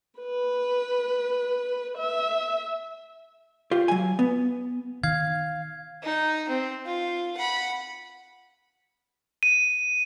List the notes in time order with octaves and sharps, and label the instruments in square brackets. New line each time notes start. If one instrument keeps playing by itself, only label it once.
[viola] B4
E5
[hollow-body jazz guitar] F4 G4
F#3 G#5
B3
[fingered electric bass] D#3 [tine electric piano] F5 [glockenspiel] G#6
[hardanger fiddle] D#4
C4
F4
F#5 B5
[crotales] D#7